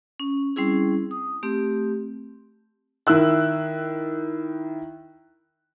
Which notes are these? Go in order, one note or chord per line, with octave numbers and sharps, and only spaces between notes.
C#4
G3 C4 C#4 E4 G#4
D#6
A3 C4 G4
D#3 E4 E6 F#6